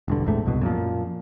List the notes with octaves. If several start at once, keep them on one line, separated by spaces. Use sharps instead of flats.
E1 G2 D3
A#1 E2 G#2 A3
C2 G2 B2
F#2 A#2 F3